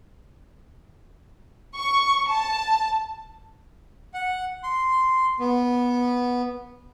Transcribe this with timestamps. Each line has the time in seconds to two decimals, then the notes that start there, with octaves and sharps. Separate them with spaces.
1.76 C#6
2.30 A5
4.14 F#5
4.63 C6
5.39 B3